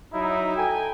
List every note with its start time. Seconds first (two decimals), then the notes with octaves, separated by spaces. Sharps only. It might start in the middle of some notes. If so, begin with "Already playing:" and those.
0.13 F#3 D#4 E4
0.56 A4 G5 G#5